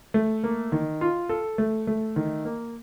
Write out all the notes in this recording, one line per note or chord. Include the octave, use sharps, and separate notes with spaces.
A3
A#3
D#3
F4
A4
A3
A3
D#3
A#3